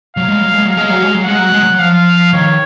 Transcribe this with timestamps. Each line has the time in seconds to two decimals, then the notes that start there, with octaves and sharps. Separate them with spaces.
0.16 F#3 F5
0.28 G#3
0.40 F#3
0.54 G#3
0.65 F#3
0.71 F5
0.77 G#3
0.90 F#3
1.02 G#3
1.15 F#3
1.25 G#3 F#5
1.39 F#3
1.52 G#3
1.63 F#3
1.79 F3 F5
2.33 D#3 C#5